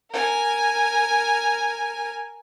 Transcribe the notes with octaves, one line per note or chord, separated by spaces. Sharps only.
A#4 G#5